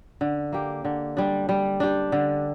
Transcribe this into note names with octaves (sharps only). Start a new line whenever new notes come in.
D3
A#3 G4
D3
G3 D4
G3
D4 G4
D3